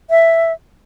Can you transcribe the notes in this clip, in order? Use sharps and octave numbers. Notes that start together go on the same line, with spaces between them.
E5